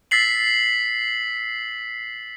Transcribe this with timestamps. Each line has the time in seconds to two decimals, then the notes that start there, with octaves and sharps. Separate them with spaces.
0.11 E6 A6 B6 C7 F#7